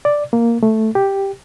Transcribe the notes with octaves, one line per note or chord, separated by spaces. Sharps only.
D5
A#3
A3
G4